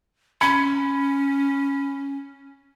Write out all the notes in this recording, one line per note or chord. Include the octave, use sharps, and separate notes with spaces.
C#4 B5 G#6 C#7